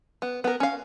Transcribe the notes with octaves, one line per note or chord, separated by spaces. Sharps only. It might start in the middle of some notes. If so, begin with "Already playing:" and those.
B3
B3 A#4
C#4 F5